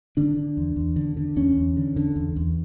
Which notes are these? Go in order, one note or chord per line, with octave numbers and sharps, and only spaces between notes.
D3 D4
D3
E2
E2
D3
D3
E2 C#4
E2
D3
D3
E2
E2